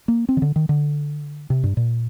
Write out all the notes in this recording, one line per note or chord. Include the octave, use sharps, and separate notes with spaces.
A#3
C4
D#3
D3
D#3
D3
C3
G2
A#2